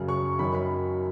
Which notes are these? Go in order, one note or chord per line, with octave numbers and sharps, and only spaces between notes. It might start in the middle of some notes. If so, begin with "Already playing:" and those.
Already playing: F#2 C#3 F#3 C#4
C#6
F#2 D#3 F#3 C#4 B5
B5